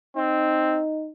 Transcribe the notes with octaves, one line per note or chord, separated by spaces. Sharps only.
C4 D#4